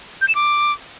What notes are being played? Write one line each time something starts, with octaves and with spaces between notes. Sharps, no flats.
G6
E7
D6